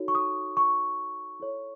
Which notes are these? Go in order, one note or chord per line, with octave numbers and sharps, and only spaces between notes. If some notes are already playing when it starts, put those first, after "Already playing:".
Already playing: D#4 F#4 A4 C#5
C#6
D#6
C#6
E4 A4 C#5